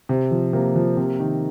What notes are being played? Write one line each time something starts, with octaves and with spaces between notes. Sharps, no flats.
C3
F3
C3 A#3
F3
C3
D#3